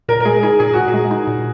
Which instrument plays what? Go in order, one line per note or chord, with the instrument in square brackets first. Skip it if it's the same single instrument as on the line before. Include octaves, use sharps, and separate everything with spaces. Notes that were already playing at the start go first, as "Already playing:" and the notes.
[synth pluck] A#2 [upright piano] A#4
[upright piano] A#4
[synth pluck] G#3 [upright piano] G#4
[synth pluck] D#4 [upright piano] G#4
[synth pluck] A#2 [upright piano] G#4
[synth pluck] A#2 [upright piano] F#4
[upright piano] G#4
[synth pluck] G#3
D#4
A#2